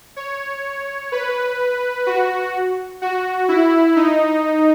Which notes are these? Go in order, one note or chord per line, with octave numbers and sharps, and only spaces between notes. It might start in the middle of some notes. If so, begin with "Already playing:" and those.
C#5
B4
F#4
F#4
E4
D#4